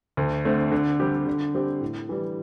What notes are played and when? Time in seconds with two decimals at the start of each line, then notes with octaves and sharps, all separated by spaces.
0.17 D2
0.45 D3 A3 C4
0.72 D3
1.00 G3 C4 G4
1.27 D3
1.54 G3 C4 G4
1.81 A2
2.09 E3 G3